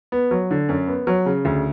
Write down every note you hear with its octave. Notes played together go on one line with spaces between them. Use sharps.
B3
F#3
D3
F#2
B3
F#3
C#3
D2